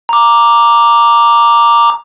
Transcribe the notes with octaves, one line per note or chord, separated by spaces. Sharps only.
A#5 D6